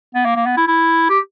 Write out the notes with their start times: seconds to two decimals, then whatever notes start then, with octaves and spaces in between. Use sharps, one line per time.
0.15 B3
0.25 A#3
0.36 A#3
0.46 B3
0.57 E4
0.68 E4
1.10 G4